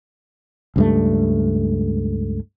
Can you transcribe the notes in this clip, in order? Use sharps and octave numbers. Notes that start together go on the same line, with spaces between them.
C#2 G2 A3